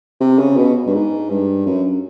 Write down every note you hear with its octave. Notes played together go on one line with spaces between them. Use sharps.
C3
C#3
B2
G2
G#2
G2
F#2